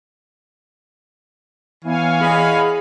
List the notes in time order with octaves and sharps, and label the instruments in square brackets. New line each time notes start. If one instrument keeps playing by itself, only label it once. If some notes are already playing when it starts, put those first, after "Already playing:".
[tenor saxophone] E3 [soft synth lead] B3 [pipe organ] C#5 F5 G#5
[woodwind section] E2 D#5 B5 [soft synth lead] G#4